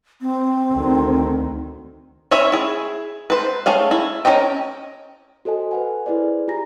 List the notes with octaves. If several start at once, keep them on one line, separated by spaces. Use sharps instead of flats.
C4
D2 D#3
C#4 C#5 E5 B5
E4 G#4
B4 C5
A3 C#4 G#4 F5
E4
C#4 A4 A#4 D#5 G5
F#4 A4 C5 D#5 G#5
B4 F#5 G#5
E4 G#4 B4 C5 D5
F4 G4 G#5 A#5 A#6